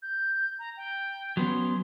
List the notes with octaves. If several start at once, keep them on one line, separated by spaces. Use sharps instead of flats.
G6
A#5
G5
F#3 B3 C#4 C6